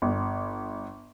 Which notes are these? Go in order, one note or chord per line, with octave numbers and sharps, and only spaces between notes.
G1